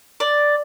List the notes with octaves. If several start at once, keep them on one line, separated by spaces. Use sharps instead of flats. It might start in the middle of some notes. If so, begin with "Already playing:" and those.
D5